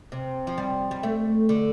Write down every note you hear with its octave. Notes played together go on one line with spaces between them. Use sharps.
C3
F3
G3
G3
A3
D3